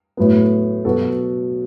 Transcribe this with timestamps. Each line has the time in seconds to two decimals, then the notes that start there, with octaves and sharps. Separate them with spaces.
0.17 A2 F#3 B3
0.85 B2 F#3 B3 F#4 A4